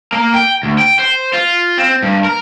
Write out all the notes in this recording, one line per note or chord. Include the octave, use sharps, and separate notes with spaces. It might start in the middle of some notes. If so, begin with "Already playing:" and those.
A#3
G5
D2
G5
C5
F4
C4
G2
A#4